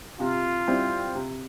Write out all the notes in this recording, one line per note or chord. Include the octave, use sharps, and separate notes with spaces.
C3 F4
G3 C4 E4 G4
C3